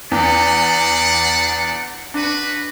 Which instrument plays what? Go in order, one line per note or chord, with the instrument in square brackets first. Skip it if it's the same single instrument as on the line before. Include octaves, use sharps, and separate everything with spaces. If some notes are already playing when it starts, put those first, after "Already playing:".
[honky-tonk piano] E2 [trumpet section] D4 D5 F#5
[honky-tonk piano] D4 [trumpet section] F#4 B4